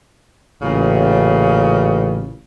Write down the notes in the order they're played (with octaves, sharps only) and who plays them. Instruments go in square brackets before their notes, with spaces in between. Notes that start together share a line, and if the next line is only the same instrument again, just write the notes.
[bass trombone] A1 [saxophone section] A#2 C#3